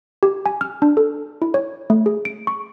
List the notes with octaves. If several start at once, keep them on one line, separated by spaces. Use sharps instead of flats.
G4
G#5
F6
D4
A4
E4
C#5
A3
G#4
D7
C#6